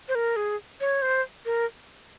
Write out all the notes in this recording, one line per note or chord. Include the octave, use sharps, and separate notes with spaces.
C5
A#4
G#4
C#5
C5
A#4